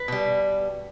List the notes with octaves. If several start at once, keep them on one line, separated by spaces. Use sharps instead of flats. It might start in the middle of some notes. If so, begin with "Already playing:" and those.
Already playing: B4
B2 G3